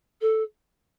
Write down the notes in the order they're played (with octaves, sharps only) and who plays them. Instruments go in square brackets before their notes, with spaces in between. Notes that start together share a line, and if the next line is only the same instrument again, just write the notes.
[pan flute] A4